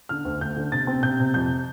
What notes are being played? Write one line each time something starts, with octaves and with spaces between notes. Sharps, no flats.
D3 F6
D2
D2 G6
D3
C3 A6
C4
C3 G6
C3
F2 G6